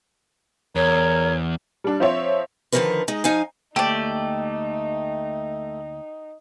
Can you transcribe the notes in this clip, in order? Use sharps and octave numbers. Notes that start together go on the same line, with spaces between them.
E2 A#4 C#5
G3 D4
F3 C4 C5 C#5 E5
D3 D#3 F3 C#4 A#4 B4
G#3 D#4
F3 D#4 F5 G#5
D2 A3 A#3 D#4 G4 D5 A5